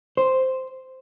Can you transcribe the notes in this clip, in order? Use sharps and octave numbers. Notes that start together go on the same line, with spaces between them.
C5